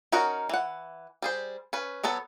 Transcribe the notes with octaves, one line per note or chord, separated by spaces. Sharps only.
C#4 D#4 F#4 A#4 F#5
E3 F#5
G3 G#4 C5
C#4 B4
F#3 B3 A4 C#5